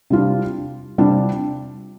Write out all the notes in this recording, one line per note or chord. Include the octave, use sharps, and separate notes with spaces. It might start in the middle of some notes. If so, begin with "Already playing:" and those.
C3 G3 D4 F4
C3 G3 D4 F4